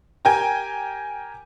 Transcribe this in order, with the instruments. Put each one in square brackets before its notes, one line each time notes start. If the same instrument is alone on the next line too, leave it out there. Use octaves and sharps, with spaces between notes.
[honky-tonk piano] G4 A#4 G5 G#5